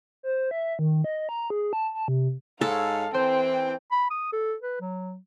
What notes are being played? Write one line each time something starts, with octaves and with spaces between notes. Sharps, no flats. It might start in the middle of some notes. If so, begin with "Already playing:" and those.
C5
E5
D#3
D#5
A#5
G#4
A5
A5
C3
G#2 G#3 A4 C#5 F5
E3 C4 C5 G5
B5
D#6
A4
B4
F#3